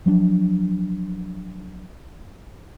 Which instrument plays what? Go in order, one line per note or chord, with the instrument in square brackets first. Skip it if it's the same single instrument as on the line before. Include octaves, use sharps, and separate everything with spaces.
[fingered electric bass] F3 F#3 C4 D4